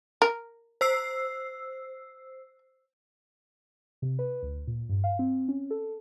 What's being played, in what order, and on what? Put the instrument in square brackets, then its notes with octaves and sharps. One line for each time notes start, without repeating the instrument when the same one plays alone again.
[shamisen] A#4
[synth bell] C5 E6 C7
[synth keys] C3
B4
D2
A#2
G2
F5
C4
C#4
A4